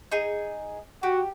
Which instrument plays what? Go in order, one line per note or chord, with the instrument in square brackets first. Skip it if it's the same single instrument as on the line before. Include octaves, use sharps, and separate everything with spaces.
[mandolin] D#4 G#4
[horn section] F#4 [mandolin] G4